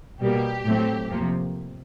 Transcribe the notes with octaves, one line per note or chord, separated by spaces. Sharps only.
B2 G3 A#3 G4
A2 F#3 A3 C4
F2 C3 F3 A#3